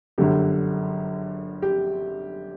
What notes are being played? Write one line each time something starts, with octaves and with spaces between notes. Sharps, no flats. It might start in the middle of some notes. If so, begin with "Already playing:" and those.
G1 F#2 D3 G4
G4